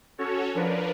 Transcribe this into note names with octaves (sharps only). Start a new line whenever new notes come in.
C#4 F#4 A4 C#5
F3 D4 A#4 B4